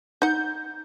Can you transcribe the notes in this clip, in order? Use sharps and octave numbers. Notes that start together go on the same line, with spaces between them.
D#4 F#5 G6